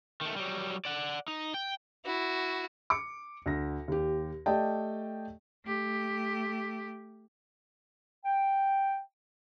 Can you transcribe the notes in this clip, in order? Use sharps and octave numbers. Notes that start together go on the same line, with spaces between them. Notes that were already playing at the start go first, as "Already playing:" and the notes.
D#3 A3
F#3 G3
D5 F#5
D#4
G5
E4 F#4
D6 C#7
D2 A#6
D#2 G4
A3 G4 D5 D#5 G5 A5
A3 G4
G5